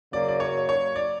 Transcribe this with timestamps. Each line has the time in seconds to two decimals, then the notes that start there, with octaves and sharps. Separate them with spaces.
0.13 F#2 C#3 F#3 A#3 D5
0.28 D5
0.40 C#5
0.69 C#5
0.96 D5